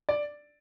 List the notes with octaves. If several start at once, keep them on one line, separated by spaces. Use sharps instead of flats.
D5